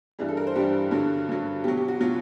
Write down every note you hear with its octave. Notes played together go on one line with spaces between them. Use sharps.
G2 E3 G3 G#4
A4
A#4
C5
G2 E3 G3 G4
G2 D3 F#3
G2 D3 F#3
B2 F#3 G4
G4
F#4
B2 F#3 F4